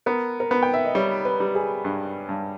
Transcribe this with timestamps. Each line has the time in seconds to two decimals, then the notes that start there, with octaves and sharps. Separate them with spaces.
0.06 B3 A#4
0.40 A#4
0.51 B3 B4
0.63 G5
0.74 E5
0.85 D#5
0.95 G3 C#5
1.25 B4
1.40 G3
1.55 G#4
1.85 G2
2.29 G2